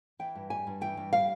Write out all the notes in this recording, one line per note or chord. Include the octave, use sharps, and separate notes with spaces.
E3 G5
G2
G3 G#5
G2
E3 G5
G2
G3 F5